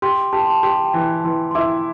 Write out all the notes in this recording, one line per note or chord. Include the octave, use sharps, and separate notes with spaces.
G4 C6
G4 A5
C6
A5
G4 C6
G5
E3 A5
A5
E3 C6
C6
E4 D6